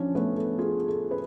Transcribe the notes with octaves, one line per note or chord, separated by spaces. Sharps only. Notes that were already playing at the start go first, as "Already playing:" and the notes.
Already playing: F3 C#4 D4 C#5
A3 B3 B4
A4
F4 G#4
A4
B4